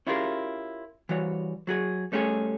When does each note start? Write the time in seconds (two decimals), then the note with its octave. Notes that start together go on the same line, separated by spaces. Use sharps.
0.07 C#4 E4 F4 G4 G#4 A#4
1.09 E3 G3 F#4 C#5
1.67 F#3 F#4 G#4
2.12 G3 A3 C#4 G4 G#4